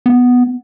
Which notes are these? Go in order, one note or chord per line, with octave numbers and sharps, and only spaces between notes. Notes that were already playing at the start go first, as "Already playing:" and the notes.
B3